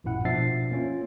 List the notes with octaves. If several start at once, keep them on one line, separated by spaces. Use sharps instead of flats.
A1 F#2 A#2 E4 F#5
B2 F3 D4 E5 A6 C7
A#3 C#4 F4